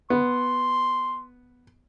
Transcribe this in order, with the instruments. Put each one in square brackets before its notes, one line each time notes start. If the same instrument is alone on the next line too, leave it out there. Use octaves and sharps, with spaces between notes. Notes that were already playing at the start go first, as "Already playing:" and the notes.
[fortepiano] B3 [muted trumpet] C6